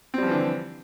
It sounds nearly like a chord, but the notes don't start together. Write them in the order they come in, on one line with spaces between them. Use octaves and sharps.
C4 G3 F3 E3 D3